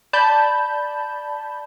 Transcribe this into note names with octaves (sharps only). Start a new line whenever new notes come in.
D5 A5 B5 G6